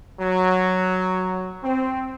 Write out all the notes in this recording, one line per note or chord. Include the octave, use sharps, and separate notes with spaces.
F#3
C4